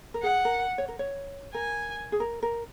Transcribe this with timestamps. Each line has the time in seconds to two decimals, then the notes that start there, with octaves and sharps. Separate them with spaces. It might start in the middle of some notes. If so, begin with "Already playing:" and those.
0.14 A#4
0.23 G#4 F#5
0.45 A#4
0.78 C#5
0.88 A#4
0.99 C#5
1.54 A#4 G#5
2.12 G#4
2.20 A#4
2.43 A#4